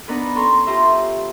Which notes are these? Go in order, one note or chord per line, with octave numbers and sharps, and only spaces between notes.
B3 D4 D#4 A#4 B4
C#4 A4 A#5 C6 C#6
F4 G4 C5 E5 A#5
A4